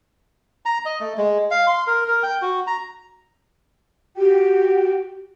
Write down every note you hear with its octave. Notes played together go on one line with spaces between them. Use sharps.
A#5
D#5
A3
G#3
F5
C6
A#4
A#4
G5
F#4
A#5
F#4 G4 G5